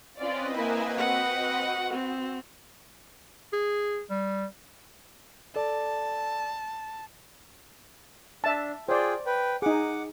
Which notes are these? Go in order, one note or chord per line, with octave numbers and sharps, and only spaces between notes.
C4 C#4 F4 B4 D5 D#5
A#3 E4 G#5
F#4 F#5
C4
G#4
G3
A4 D5 A5
D4 E5 A5
F4 G#4 C5 D5 G5
B4 G5
D#4 G#4 F#5 D6